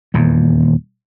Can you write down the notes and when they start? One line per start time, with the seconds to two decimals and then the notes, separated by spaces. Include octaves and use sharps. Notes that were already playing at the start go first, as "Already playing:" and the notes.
0.14 D#1 E2